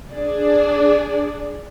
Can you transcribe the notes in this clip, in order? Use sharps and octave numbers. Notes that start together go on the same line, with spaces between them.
D4 G#4 D5